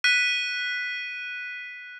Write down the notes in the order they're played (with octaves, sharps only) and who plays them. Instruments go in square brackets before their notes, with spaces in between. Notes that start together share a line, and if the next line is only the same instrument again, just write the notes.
[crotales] F#6 B6 D#7